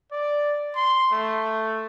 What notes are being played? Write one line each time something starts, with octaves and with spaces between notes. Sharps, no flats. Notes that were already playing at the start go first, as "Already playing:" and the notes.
D5
C6
A3